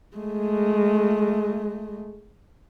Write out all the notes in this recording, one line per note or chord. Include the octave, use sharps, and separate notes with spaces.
G#3 A3